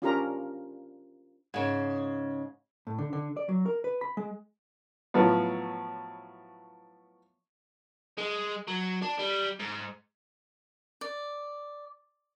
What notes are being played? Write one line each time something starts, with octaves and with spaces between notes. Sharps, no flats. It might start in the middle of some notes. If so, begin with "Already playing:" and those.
C#4 D4 F4 G4 A#4 A#5
G#2 C#3
A2
D3
D3
D5
F#3
A#4
B4
B5
G#3
A2 F3 F#3 B3
G#3
F#3
D4
G3
G#2
D5